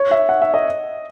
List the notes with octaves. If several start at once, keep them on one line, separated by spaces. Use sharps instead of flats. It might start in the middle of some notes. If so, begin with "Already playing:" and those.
Already playing: C#5
E5
F#5
E5
D#5